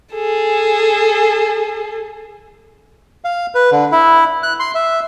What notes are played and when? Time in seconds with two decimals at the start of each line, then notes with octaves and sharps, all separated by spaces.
0.14 G#4 A4
3.24 F5
3.55 B4
3.72 D3
3.92 E4
4.43 F#6
4.60 C6
4.75 E5